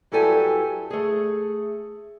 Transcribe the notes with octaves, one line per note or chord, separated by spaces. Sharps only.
G2 F#3 E4 G4 A4 G#5
A3 G#4